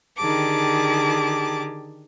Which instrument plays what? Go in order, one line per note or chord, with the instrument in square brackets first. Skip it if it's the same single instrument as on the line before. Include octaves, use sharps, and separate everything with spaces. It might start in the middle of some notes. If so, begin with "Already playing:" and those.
[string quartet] D3 D#3 G4 G#4 A5 D6